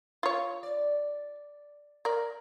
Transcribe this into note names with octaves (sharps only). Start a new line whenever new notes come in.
F4 C#5
D5
A#4 D5